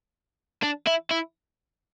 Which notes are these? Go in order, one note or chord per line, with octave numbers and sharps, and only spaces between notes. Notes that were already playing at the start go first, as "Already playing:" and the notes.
D4
E4
E4